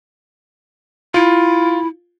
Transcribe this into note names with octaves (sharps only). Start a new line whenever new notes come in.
E4 F4